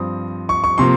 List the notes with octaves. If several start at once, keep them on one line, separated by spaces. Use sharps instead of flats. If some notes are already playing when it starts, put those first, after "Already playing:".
Already playing: G2 F3 C4 D#6
C#6
C#6
C3 F3 A#3 C6